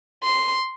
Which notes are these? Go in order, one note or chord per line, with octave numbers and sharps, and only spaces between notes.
C6